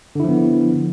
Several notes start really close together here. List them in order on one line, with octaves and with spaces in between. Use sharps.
D3 E4 F3 B3